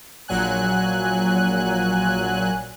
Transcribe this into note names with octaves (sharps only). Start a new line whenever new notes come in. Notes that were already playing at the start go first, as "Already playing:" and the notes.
A#1 A#2 F#3 G#5 F#6